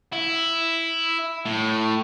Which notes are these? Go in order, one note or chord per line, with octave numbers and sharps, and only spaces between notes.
E4
A2